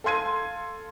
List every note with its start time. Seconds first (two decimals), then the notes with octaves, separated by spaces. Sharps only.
0.04 A4 F5 C6 G#6 D#7